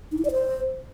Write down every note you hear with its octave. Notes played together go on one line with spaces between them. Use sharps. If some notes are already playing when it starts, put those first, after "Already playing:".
D#4
E4
D5
C5